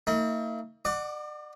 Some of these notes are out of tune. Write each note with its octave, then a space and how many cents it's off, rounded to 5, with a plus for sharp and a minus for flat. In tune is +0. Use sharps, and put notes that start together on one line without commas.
A#3 -45 D#4 +45
D5 +40 F#5 +0 D6 +0